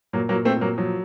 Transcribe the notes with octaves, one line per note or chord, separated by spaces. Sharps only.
A#2 F#3 A#3
F#3 A#3
A#2
A3 C4
A#2
F#3 A#3
F3 F#3